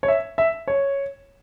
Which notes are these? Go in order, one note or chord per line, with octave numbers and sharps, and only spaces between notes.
C#5
E5
E5
C#5